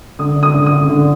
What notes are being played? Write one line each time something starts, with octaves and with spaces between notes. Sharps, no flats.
D3 D#6
D3
D#6
D3
D#6
D3
D3